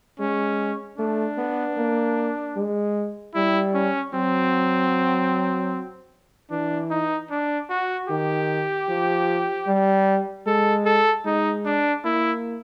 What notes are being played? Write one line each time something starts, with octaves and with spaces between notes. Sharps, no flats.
G#3 C#4
A3 D4
B3
A#3
G#3
G3 E4
C#4
F#3 C4
E3 D4
D#4
D4
F#4
D#3 G4
F3
G3
G#3 A4
A4
G#3 D#4
D4
A#3 E4